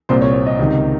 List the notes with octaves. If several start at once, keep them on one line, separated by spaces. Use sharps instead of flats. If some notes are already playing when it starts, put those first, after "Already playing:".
C2 A#2 C5
C#5
C#5
D#5
C#2 C3 D#3